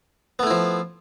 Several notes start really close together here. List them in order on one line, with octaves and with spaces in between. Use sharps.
B3 A3 E4 F3